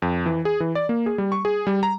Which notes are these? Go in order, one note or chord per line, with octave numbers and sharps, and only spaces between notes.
F2
E3
G#4
E3
D5
A#3
G#4
G3
C#6
G#4
G3
A#5